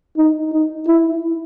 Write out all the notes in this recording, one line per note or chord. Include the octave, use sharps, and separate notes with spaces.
D#4
D#4
E4